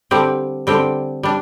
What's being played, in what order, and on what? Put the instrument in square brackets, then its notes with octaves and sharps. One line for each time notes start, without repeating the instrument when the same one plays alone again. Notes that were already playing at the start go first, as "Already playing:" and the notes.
[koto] D3 G3 C4 G4
D3 G3 C4 G4
G3 D4